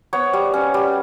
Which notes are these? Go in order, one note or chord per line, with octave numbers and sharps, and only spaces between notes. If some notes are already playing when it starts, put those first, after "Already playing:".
B3 C#5
G3
C#4
G3